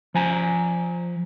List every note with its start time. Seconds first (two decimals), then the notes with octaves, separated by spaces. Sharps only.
0.14 F3 G#5 A#5